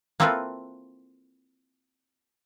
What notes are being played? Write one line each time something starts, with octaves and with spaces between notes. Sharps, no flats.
A#3 C4 E4 F4 A4 B4